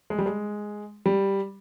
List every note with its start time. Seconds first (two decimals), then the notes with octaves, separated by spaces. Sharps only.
0.10 G#3
0.19 G3
0.26 G#3
1.06 G3